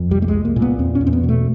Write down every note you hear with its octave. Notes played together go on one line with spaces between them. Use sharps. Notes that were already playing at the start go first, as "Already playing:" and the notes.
Already playing: F2
C2 G3
A3
G#3
C2
A#3
A#2
B3
E2 C4
C#4
E2
C4
B3
B2
A3